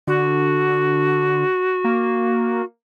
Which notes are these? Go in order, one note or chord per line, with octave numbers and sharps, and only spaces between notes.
D3 F#4
A#3